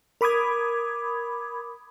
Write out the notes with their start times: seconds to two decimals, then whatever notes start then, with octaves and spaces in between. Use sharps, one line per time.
0.21 A#4 B5 D6 D#6 G#6